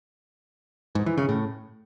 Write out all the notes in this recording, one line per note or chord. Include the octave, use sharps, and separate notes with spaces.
G#2
E3
C#3
A2